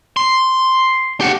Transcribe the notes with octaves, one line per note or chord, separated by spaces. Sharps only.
C6
G4 F#5